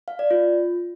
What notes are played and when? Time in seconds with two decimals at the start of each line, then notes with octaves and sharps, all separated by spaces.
0.08 F5
0.19 D5
0.31 F4